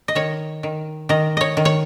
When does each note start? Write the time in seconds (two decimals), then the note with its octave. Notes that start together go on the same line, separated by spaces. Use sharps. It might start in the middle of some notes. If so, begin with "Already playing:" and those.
0.08 D#5
0.15 D#3 C#5
0.63 D#3
1.09 D#3 D#5
1.37 C#5 D#5
1.57 D#3
1.65 C#5